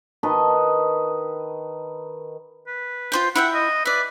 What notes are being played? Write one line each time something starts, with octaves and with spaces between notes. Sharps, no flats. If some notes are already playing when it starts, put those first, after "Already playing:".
D#3 B4 D#5 A5
B4
F4 C5 G5
E4 E5 F#5 G5
D#5
B4 D5 E5